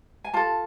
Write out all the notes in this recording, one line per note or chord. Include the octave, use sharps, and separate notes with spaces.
G#5
F4 A4 A5